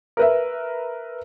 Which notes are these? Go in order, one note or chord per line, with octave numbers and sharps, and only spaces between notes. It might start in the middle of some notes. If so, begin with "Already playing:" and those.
A#4 B4 E5